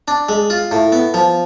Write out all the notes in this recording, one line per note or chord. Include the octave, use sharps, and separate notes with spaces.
D4
G#3
F4
A2
B3
F3